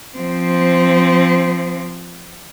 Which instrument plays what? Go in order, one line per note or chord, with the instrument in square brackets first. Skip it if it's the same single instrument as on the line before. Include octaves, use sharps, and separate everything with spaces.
[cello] F3 C4